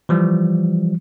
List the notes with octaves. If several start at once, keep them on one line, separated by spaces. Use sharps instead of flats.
E3 F3 G3